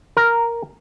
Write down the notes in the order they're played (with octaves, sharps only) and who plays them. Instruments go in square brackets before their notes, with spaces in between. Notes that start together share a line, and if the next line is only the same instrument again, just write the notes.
[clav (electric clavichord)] A#4